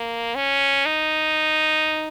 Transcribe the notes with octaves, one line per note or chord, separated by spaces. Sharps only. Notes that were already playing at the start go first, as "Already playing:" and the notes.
Already playing: A#3
C#4
D#4